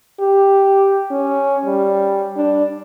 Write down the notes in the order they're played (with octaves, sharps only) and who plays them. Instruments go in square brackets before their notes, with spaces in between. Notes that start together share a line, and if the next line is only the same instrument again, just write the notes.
[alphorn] G4
C#4
G3
D4